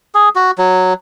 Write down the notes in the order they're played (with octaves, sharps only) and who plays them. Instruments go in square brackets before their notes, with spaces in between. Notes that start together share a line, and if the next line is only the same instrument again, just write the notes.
[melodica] G#4
F#4
F#3